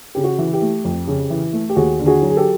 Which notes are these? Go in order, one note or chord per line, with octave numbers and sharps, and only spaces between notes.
C#3 G4
F#4
E3
G4
A3
F2
C#3
E3
A3
G4
D#2 F#4 G#4
D3
F#4 G#4
F#3
G#4
G4 A4